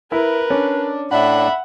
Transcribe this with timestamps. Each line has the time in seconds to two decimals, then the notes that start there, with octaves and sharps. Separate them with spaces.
0.12 E4 A#4 B4
0.50 C#4 D4
1.11 A2 D4 E5 F#5 B5